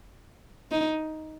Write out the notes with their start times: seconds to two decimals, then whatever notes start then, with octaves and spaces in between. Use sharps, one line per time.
0.71 D#4